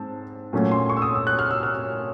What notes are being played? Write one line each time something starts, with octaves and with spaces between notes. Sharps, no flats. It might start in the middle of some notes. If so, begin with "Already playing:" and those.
Already playing: G#2 C4 A5
A#2 F#3 A3 C#4
C6
C#6
E6
D#6
E6
F#6
F6
E6
F6